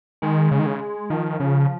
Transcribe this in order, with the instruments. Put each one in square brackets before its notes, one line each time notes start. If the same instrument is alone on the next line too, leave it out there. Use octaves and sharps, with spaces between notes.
[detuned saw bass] D#3 [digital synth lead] G#3
[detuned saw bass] C#3
D#3
C#3
[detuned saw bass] D#3 [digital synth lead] F3
[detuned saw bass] C#3